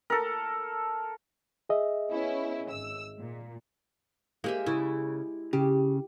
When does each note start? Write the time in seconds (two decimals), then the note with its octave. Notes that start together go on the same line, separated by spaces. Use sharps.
0.10 A4 A#4
1.69 G#4 D#5 E5
2.10 B3 C#4 E4
2.70 G#1 E6
3.19 A#2
4.44 G#3 A#3 G4 E5
4.66 C#3 E4
5.53 C#3 G4